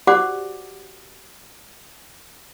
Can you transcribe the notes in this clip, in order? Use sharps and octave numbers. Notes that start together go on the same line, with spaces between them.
F#4 G4 C5 D5 F#5 D6